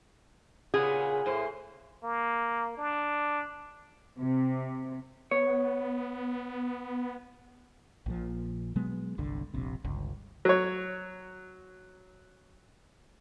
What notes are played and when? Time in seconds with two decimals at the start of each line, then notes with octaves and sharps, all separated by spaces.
0.74 A#2 C#3 B3 G#4
1.26 A2 C5
2.03 A#3
2.77 D4
4.18 C3
5.31 B3 C#5
8.06 A#1 A#2 F3
8.76 B2 F#3 G#3 B3
9.18 G1 C2 D3
9.54 E1 A#1 C3
9.85 G1 C#2
10.45 F#3 C#5